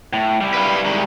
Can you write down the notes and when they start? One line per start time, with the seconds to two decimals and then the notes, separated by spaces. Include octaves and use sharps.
0.13 A2
0.41 G3 E4
0.54 B4 F5
0.86 G#2 D#3